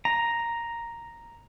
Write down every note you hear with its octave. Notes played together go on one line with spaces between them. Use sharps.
A#5